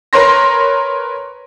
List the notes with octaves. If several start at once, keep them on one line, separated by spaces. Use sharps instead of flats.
A#4 B4 C#5 C6 A#6